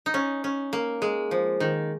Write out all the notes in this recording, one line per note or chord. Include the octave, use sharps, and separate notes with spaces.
D#4
C#4
C#4
A#3
G#3
F3
D#3